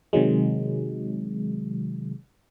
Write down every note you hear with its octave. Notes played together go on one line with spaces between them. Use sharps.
C3 D#3 F#3 G#3